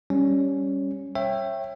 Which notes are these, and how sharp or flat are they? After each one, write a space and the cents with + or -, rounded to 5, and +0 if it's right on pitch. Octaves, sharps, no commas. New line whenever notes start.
G3 +0 C#4 +0
C#5 -25 E5 +15 G5 +0